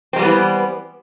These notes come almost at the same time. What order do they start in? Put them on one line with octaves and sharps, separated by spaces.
C4 G#3 G3 B3 E3